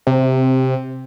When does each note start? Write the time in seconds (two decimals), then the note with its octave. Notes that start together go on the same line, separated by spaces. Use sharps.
0.07 C3